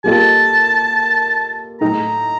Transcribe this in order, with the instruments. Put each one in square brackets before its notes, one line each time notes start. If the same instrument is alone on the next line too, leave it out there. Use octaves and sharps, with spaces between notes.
[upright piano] G3 A#3 F4 A4 D#5 [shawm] A5
[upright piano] A2 A3 D#4 A4 [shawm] A#5